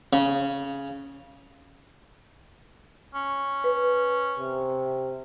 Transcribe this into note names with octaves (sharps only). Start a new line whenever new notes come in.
C#3
C#4
B4
C3